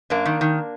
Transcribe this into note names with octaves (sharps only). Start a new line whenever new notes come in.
F#2 A#3 D4
D#3
D#3